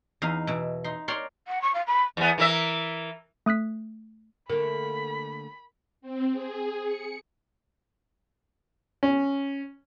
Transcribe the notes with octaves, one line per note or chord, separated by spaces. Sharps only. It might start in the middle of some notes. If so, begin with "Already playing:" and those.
E2 D#4 F5
B2 E3
D#4 C6
A#4 C#5 D5 G5 A#5 C6
F#5
C#6
F5
B5
E2 B3
E3 A#4 E5
A3 D#6 F#6 B6
D3 A3 A#3 A#4 B5
C4
G#4
C#7
C#4